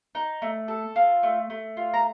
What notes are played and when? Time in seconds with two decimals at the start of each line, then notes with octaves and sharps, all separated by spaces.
0.15 D#4
0.42 A3
0.68 A4
0.96 F4
1.23 A3
1.50 A3
1.77 F4
1.94 A#5